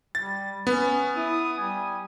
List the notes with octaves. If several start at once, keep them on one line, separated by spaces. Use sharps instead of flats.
G3 A6
B3 C#4
E4 D#6
G3 G#5